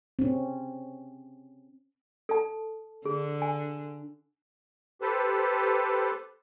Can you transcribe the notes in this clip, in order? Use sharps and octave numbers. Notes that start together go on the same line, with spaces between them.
C4 C#4
A4 A5
D3 G#4
G#5
G4 A4 B4 C5